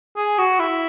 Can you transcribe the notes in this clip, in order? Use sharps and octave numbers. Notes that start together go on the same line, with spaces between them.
G#4
F#4
E4